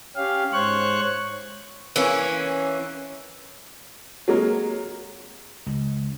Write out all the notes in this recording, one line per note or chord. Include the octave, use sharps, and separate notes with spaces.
C#4 G4 F5
G#2 C5 C#5 C#6 F#6
E3 A#3 C#4
F#3 G#3 A#3
C#2